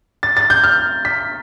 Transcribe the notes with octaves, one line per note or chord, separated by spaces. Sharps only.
A6
A6
G6
F6
B6